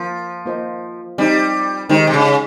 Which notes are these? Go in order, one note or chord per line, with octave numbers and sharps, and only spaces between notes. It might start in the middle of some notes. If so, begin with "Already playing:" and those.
Already playing: F3 A#3 F4 A#4 F5
A#3 F4 C5 D#5
G3 C4 D#4 G4
D#3 G#3 D#4 G4 C5
C3
C#3